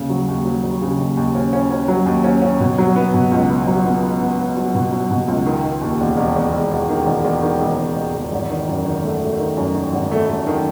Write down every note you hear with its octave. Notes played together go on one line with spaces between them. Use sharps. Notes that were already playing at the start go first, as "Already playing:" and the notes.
Already playing: D#2 C#3
F#3
D#2
F#3
F#3
C#3
D#2
D#2
C#4
C#4
C#4
F#3
D#2
C#4
C#4
B2
F#3
B3
B2
C#2
B3
F#3
B3
B3
B3
B3
F#3
B2
F#3
B2
C#2
D#3
D#3
D#2
E1
E1
E1
E1
E1
D#3
E1
E1
D#3
E1
E1
E1
E1
G#1
D#3
F#2
D#3
A3
A3
D#3
F#2
D#3
G#1
A3
A3
D#3